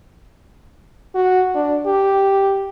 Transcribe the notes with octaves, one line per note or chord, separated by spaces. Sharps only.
F#4
D4
G4